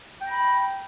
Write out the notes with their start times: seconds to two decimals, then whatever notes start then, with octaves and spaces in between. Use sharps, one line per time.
0.22 G5
0.26 A#5
0.30 B5